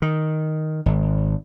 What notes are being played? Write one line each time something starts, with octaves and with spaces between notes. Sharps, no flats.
D#3
G#1